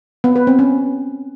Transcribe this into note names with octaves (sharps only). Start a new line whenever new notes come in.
B3
B4
C4
C#4